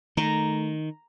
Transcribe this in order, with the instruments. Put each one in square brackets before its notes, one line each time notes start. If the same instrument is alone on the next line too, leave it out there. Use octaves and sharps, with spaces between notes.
[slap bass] D#3 [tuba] A3 [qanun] A#5